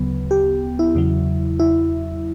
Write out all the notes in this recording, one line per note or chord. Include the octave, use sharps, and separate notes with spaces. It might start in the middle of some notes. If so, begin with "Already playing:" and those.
Already playing: D2 C#3 F#3 B3
G4
E4
E2 C#3 F#3
E4